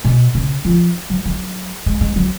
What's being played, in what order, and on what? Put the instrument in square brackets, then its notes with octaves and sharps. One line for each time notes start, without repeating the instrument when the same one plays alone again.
[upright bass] B2
C#3
F3
F#3
F#3
G#3
G#3
F#3